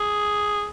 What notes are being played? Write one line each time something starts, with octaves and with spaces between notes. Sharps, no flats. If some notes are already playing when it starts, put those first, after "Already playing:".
Already playing: G#4